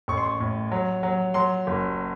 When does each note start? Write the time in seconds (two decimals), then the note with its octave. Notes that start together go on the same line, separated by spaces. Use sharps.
0.08 A1 C#6
0.17 C6
0.26 C#6
0.40 A2
0.72 F#3
1.03 F#3
1.34 F#3 C6
1.67 F#1